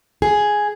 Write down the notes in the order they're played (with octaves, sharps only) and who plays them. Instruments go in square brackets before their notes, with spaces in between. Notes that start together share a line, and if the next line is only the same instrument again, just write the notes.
[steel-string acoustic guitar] G#4